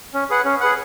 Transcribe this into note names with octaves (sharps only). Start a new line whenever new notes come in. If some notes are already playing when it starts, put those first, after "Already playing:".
C#4
G#4 B4 F#5
C#4
G#4 B4 F#5